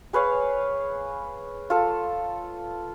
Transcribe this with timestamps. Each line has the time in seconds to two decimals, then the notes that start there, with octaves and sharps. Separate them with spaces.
0.13 G#4 B4 C#5 F5
1.70 F4 A4